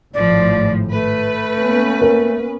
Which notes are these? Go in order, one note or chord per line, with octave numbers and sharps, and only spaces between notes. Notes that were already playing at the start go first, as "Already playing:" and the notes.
G#1 A2 F3 D5
A3 B4
A#3 B3 C#4
A#4